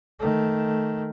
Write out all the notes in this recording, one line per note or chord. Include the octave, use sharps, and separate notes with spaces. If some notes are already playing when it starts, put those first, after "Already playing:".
D#3 A3